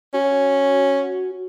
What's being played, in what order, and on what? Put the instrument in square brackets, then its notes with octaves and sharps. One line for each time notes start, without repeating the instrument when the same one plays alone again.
[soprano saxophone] C#4 [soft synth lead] F#4